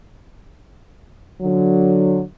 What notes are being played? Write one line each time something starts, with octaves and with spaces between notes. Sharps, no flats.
D3 F#3